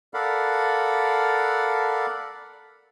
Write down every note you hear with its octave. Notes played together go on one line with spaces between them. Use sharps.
A4 A#4 D5 F5 F#5 B5